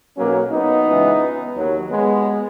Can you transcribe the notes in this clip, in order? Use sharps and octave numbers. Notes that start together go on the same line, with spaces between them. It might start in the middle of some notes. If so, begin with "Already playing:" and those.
B1 B2 F#3 A#3 C#4
B3 D#4
C#2 C#3 E3
D#2 D#3 F#3
G#3 B3